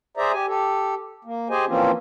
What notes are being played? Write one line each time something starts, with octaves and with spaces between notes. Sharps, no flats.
G#4 C5 D5 E5 A#5
G4 G#5
G4 A4
A#3
G4 G#4 C5 D#5 G#5
E3 F3 A#3 C4 C#4 F4